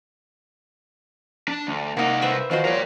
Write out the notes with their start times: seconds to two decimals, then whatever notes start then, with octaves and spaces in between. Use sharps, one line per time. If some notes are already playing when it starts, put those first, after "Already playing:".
1.48 D4
1.67 D2
1.97 C3 A#3 D#4 A#4 F#5
2.22 B4 C5 E5
2.51 D#3 F3 F#4 C5 D#5
2.65 G3 A#4 C#5 D5